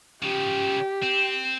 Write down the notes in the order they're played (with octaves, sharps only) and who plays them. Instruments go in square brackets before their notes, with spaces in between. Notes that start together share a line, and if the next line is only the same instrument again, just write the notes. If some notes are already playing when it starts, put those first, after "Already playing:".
[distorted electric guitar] C#3 F3 [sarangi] G4
[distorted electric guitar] C4